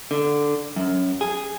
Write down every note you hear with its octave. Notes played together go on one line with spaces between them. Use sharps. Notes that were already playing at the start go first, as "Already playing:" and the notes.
D3
F#2
G#4